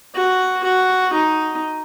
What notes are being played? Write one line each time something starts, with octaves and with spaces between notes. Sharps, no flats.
F#4
F#4
D#4